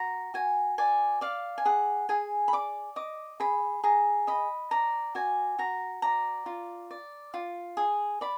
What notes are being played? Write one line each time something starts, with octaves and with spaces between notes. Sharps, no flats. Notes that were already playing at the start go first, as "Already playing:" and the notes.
Already playing: F#4 A#5
F#4 G#5
D5 G#5
D5 F5
G#5
G#4 F#5
G#4 G#5
B5
D5 D6
D#5 D6
G#4 B5
G#4 A#5
D#5 B5
D5 A#5
F#4 G#5
F#4 A#5
D5 A#5
F4
D5
F4
G#4
D5 B5